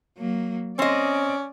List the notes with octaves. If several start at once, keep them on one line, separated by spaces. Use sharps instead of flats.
F#3 A#3
C4 C#4 D5 D#5